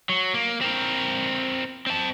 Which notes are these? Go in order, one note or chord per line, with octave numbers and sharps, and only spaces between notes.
F#3
A#3
C4 A#4
C4 A5